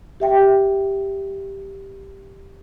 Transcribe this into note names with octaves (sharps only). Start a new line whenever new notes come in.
G4 E5 G5